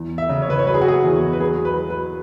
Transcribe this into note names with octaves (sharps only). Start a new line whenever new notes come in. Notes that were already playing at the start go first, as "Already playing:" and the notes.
Already playing: E2
E5
C#3
C#5
B4
C#5
F#3 B4
G#4
F#4
G#4
E2
B4
F#3 G#4
B4
F#3
B4